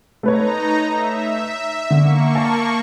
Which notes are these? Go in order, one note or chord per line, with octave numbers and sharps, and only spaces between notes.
A3 D#4 B4 C#5 A#5
E5
D3 A#3 C#6
A5